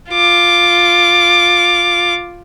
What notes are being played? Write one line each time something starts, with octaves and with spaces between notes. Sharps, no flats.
F4 D6